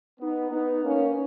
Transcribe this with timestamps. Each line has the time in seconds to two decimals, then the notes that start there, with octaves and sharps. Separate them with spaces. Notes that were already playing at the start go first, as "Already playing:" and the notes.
0.20 B3 D#4
0.52 B3 D#4
0.83 A#3 C#4